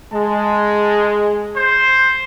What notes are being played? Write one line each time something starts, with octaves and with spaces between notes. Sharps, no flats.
G#3 A5
C5